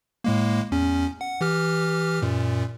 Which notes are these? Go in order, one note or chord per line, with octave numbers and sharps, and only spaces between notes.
A2 G#3 A#3
E2 C#4
F#5
E3 G4 F6
F#2 A#2